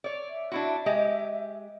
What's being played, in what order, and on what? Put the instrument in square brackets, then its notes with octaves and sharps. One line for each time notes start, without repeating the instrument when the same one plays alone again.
[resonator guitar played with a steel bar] C#5 D5
[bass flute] E5
[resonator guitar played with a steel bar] D4 E4 F#4
G#3 G4 D#5